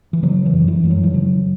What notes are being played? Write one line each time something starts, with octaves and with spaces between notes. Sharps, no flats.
E3
C#3 F#3
E3
F#2
E3
F#2 G#3
F#3
E3
C#3 F#3